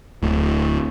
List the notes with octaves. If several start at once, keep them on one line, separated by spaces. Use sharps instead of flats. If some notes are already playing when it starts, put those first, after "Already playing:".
D1 A2